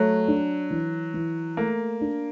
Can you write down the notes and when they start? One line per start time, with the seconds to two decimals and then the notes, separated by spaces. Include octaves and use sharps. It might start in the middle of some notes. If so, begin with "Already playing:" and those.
Already playing: F#3 A3
0.28 D4
0.71 E3
1.14 E3
1.57 A3 A#3
2.01 D4